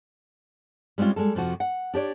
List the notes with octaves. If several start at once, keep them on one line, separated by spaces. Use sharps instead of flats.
G3 G#3 C4 C#4 F4
G3 G#3 A#3 A4
F2 C3 F3 F#4
F#5
D4 G4 C#5 D5